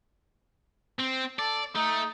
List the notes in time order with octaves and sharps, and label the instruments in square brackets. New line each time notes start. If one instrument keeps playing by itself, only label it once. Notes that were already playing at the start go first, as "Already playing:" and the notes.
[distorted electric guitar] C4
[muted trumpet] A4 [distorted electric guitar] D5
[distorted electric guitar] A3 [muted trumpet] D#4